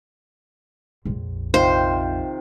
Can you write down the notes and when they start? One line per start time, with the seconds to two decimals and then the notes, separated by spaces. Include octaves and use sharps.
1.05 A#1 F2
1.54 C3 D#3 F4 C5